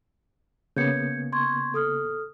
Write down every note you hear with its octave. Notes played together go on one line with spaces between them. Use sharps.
C#3 A#3 B3 G6 G#6 C#7
C6 C#6 G#6
A4 D#6 F6